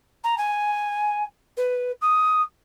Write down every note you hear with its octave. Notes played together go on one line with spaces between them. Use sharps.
A#5
G#5
B4
D#6